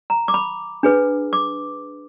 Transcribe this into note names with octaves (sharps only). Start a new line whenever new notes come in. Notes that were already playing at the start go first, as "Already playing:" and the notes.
A#5
D6
B5
D4 G#4 B4
D6